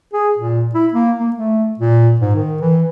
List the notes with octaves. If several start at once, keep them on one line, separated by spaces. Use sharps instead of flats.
G#4
A#2
E4
A#3
A#3
A3
A#2
G#2
D#3
E3